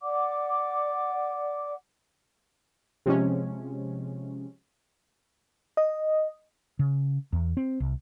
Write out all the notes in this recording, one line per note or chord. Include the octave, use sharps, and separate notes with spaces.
D5 F#5 D6
C3 F3 G#3 C#4
D#5
C#3
E2
C4
C2